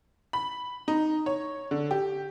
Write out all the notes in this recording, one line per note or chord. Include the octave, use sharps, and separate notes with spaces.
B5
D#4
C#5
D3
G4